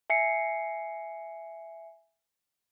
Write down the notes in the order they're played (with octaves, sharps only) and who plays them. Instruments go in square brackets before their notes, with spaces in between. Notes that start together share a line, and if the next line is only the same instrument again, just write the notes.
[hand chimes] E5 G#5 C7 C#7